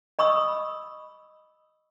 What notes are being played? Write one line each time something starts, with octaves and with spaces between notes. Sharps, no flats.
D#5 B5 C#6 D#6 E6